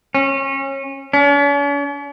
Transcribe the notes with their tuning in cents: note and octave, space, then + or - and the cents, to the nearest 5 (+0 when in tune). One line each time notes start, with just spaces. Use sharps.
C#4 -25
C#4 +45